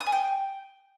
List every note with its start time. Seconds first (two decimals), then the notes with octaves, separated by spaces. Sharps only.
0.01 D#6
0.06 G#5
0.12 G5